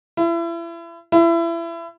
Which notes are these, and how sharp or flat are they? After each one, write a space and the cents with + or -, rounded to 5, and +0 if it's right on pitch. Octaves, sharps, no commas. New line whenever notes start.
E4 +35
E4 +30